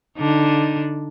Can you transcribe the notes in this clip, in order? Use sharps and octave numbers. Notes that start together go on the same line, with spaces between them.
D3 D4 D#4